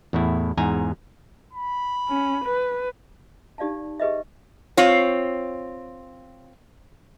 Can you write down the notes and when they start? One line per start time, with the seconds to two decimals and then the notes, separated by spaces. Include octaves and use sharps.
0.13 E2 A2 E4
0.57 E2 G#2 G#5 A#5
1.53 B5
2.09 C#4
2.45 B4
3.58 D#4 G4 D5 F5 A5
4.00 G4 G#4 B4 D#5 E5
4.77 C4 F4 C#5